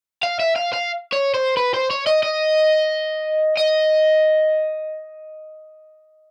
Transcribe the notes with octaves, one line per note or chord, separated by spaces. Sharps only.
F5
E5
F5
F5
C#5
C5
B4
C5
C#5
D#5
D#5
D#5